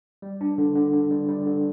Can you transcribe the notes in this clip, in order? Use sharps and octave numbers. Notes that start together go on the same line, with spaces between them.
G3
D4
D3
D3
D3
G3
G3
D3